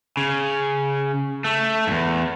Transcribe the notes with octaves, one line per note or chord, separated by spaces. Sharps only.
C#3
A3
E2 G2